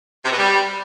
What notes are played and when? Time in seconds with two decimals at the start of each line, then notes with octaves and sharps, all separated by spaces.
0.25 C3
0.32 B2
0.38 G3